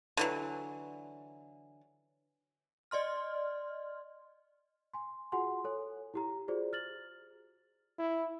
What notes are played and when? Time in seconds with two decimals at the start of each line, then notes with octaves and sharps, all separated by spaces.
0.17 D3 E3 F#3
2.91 D5 D#5 C6 F6
4.94 G#5 C6
5.32 F4 F#4 G#4 F#5 G#5 C6
5.64 A4 C#5 G#5
6.14 E4 G4 A#5
6.48 F4 F#4 G#4 C5 D5
6.73 F6 A6 F#7
7.99 E4